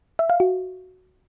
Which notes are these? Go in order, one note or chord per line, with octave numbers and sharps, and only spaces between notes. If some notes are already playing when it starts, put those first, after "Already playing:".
E5
F5
F#4